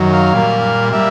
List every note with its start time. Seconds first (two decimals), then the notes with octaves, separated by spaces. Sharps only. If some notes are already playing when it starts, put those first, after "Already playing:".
Already playing: F#2 D#3 F#3
0.13 F5
0.33 A#2 G3 A#3
0.93 G3 A#3 E5